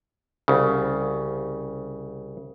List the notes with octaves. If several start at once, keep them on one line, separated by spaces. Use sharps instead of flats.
C2 C#3